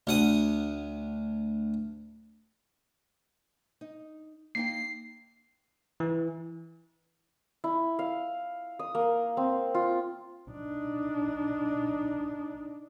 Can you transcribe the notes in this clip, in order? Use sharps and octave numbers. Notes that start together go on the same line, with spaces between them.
D2 F#5 D#6
D#4
A#3 D#4 G5 C7
E3
E4
F5
D#6
A#3
C4
F4
D4 D#4